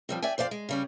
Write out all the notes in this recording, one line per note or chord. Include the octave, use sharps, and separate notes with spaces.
F3 G3 C4
D5 E5 G5 G#5
F2 C5 D5 F5
G#3
C#3 G3 C#4